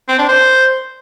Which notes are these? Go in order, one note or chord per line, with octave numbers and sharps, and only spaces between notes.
C4
D4
C5